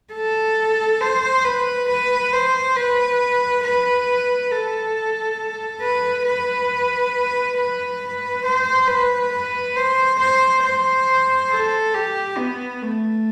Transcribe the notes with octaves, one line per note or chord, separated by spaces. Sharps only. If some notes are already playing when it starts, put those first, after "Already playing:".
A4
C5
B4
B4
C5
B4
B4
A4
B4
B4
B4
C5
B4
B4
C5
C5
C5
A4
G4
B3
A3